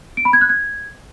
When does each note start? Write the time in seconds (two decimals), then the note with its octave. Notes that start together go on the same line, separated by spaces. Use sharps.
0.17 D7
0.25 B5
0.33 G#6
0.41 F#6
0.49 G#6